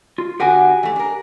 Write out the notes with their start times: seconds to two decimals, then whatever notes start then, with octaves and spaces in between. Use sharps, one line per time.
0.18 F4
0.40 D3 B3 F#4 G4 G5 G#5
0.83 E3 A3
0.96 D4 A#4